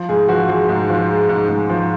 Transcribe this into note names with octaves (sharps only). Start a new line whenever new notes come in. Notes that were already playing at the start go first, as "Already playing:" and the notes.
Already playing: F3
G#2 G#4
F3 F#4
F3 G#4
G#2
F3
G#3
G#2
G#2
F3